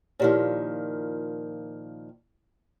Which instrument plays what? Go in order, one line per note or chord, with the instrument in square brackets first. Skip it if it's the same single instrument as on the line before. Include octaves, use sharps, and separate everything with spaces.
[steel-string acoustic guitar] A#2 D#3 F3 [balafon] E4 G4 C#5